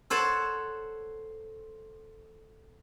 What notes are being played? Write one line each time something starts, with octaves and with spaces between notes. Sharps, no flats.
A4 C5 C#5 F#5 A5